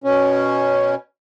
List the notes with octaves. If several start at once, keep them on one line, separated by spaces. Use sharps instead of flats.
B2 C#4